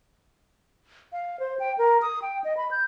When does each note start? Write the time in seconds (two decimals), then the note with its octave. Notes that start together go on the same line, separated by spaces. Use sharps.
1.12 F5
1.40 C5
1.60 G5
1.78 A#4
2.02 D#6
2.22 G5
2.44 D#5
2.57 B5
2.71 G6